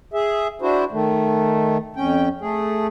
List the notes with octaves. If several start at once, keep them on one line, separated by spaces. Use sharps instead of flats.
G#4 E5
D4 E4 F#4 C5
D#3 A3
F2 C#4 G5
A3 G#4